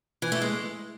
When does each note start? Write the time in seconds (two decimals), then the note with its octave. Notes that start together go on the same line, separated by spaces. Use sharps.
0.22 E3
0.32 A3
0.41 G#3